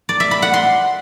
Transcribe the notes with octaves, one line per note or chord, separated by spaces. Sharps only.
D5
E5
B5
F#5
C6